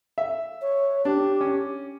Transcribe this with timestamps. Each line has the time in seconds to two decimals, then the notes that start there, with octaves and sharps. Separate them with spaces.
0.18 E5
0.62 C#5
1.05 D4 G4
1.41 C#4